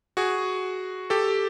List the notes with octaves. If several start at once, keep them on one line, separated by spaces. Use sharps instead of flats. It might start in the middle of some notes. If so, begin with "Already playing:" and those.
F#4 G#4
G4 A4